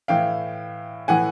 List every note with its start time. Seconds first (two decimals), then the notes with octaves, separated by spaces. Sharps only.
0.08 A2 E3 F5 G5
1.08 A2 E3 F#5 G#5